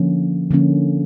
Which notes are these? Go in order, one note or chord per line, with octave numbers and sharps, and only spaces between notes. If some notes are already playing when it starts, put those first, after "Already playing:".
Already playing: D3 F3 A#3 C#4
D3 F3 A#3 C#4